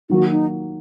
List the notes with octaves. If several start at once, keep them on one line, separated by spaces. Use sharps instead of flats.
D#3 F#3 A#3 F#4
D#4